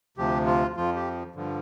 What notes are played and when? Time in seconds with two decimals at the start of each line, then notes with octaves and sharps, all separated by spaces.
0.18 D2 C3 F3 G4
0.46 F4
0.76 F2 F3 F4
0.95 G4
1.35 G2 D3 F3